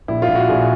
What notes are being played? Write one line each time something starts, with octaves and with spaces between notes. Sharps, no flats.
A#1 E4
F4
A#1
F#4
A#1 G#4